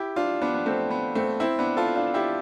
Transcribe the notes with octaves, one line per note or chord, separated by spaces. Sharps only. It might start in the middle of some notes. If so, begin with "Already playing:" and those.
Already playing: E4 G4
D4 F4
B3 D4
B3
A3 C4
B3
A3 C4
C4 E4
B3 D4
F4 A4
D4 F4
E4 G4